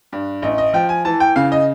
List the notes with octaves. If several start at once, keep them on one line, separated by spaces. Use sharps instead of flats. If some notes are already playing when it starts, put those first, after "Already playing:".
G2
A1 D#5
D#5
F3 G5
G#5
E3 A5
G5
C#3 F5
D#5